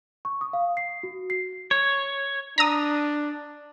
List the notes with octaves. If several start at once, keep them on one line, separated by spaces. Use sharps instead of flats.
C#6
D#6
F5
C7
F#4
C7
C#5
D4 A#5 D#6